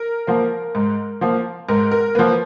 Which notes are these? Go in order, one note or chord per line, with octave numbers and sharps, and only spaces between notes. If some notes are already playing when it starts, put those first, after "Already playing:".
Already playing: A#4
F3 A#3
G#2
F3 A#3
G#2 A#4
A#4
F3 A#3 B4